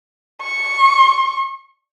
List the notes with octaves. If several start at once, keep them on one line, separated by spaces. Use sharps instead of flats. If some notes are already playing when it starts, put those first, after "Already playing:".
C#6